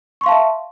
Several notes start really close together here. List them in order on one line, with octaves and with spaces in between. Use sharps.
C#6 C6 F5 A5 E5